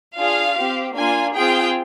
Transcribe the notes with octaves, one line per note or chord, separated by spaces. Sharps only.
D4 F4 G#4 F5
C4 G4
A#3 D4 F4 G#5
C4 F4 G#4 G5